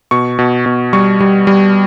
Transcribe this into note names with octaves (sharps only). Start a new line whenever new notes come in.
B2 C#6
B2
B2
G3 C#6
G3
G3